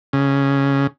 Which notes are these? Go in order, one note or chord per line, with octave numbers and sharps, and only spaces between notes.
C#3